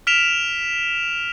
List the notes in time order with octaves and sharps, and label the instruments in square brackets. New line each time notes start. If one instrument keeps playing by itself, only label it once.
[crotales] F6 B6 D7 E7 F7